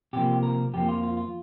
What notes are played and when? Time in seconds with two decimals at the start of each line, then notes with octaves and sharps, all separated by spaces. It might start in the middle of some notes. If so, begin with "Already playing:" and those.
0.13 C3 F3 A#3 G4
0.43 A#4
0.73 F2 F3 A#3 G4
0.88 F4
1.03 F4
1.17 F4